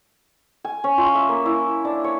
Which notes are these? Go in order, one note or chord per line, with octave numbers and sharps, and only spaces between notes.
G#5
C#4
F4
E5
A#3
E4
D4
C#5